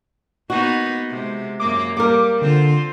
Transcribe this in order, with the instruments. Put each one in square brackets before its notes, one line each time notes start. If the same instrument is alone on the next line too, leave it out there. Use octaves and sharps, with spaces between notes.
[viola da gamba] A#3 B3 D#4 [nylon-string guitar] F#4
[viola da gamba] C3 G#3
[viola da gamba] F#2 A#3 [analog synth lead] D6
[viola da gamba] G3 [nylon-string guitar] A#3 A#4 [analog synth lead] D6
[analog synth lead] D3 [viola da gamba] C4 F4 C5